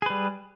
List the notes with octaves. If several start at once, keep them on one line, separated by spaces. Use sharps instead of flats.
G3 G#4 B4